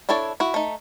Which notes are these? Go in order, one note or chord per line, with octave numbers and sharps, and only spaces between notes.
D4 E4 A4 C#5 D5
E4 F#4
A3 D#4